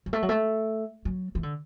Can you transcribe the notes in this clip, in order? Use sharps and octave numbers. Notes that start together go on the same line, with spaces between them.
F#3
A3
F#3
A3
F#3
E3
D3